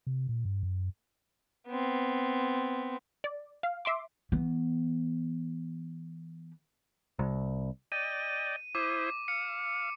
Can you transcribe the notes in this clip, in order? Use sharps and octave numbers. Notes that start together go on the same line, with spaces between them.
C3
A#2
G2
F#2
B3 C4
D5
F5
E5 C6 D6
E3 B3
C2
D5 D#5 G5 D#7
E4 C5 D6 D#6
F5 C#7